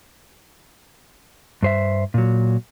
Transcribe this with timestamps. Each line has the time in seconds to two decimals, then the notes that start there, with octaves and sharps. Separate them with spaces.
1.63 G2 C5 E5
2.14 A#2 F#3